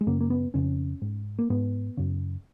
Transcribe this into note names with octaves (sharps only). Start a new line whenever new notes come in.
G#3
F#2 C#3 A#3
A#3
B3
F2 C#3 C#4
G#2
A#3
G#2 B3
F#2 C#3